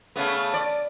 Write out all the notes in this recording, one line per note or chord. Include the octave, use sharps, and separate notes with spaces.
C#3 A3 B3
D5